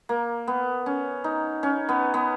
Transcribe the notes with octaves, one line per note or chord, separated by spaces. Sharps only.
A#3
B3
C#4
D#4
C#4
B3
B3